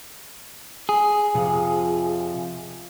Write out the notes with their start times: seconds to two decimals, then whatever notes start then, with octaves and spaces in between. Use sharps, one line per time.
0.89 G#4
1.34 F2 C3 F3